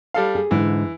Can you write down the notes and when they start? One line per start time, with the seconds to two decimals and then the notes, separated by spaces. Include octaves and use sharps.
0.14 G3 A4 F5
0.35 G#4
0.51 G#2 D3 E3 D#4